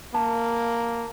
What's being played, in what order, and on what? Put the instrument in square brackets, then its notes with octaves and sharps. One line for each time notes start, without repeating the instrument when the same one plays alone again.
[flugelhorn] A#3 [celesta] A5